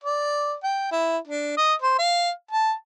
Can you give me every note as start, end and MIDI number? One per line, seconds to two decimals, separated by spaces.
0.04 0.54 74
0.64 0.88 79
0.92 1.18 64
1.28 1.57 62
1.57 1.75 75
1.82 1.95 72
1.99 2.30 77
2.52 2.73 81